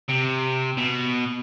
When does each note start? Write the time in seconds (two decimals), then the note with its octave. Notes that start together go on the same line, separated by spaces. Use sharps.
0.09 C3
0.77 B2